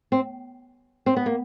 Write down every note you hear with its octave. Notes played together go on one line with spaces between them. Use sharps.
C4
C4
B3
A#3